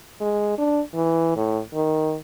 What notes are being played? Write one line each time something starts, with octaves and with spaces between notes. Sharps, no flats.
G#3
D4
E3
A2
D#3